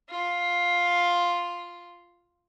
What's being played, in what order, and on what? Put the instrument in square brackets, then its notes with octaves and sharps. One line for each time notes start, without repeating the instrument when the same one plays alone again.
[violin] F4